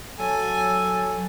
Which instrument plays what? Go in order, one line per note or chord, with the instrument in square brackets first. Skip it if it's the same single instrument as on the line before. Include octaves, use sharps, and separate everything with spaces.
[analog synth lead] F#3 [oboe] A4 [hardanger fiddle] G#5